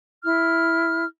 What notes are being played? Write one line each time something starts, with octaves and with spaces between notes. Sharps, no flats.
E4 F6